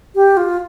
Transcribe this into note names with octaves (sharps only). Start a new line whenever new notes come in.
G4
F4